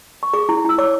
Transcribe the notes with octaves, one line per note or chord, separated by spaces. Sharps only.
C#6
G#4 D6
E4
E4 E6
C#5 D6